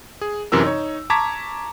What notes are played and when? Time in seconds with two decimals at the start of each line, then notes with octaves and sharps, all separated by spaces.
0.21 G#4
0.52 F#2 C3 E3 A#4 E6
0.64 D#4 C#5
1.10 A5 A#5 C#6 D6 G#6 B6